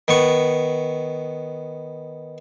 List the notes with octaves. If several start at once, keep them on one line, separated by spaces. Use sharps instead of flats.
D#3 B3 C#6